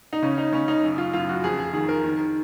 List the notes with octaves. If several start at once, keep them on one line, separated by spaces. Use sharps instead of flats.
D#4
C#3 C#4
D#4
C#3 C#4
D#4
F#2
F4
F#2 F4
F#4
F2 G#4
G#4
D#3 G#4
A#4
D#3